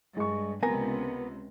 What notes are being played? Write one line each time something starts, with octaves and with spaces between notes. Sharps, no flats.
G2 G#3 C#6
C#2 C3 B3 A#4 G#5 A#6